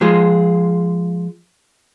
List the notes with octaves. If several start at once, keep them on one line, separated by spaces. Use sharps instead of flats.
F3 G#3 F4 G#4